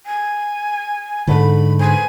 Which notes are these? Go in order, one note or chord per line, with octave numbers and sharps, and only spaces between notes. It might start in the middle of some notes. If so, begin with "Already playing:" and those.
G#5
G#2 D3 A3 B5
B4 C5 G#5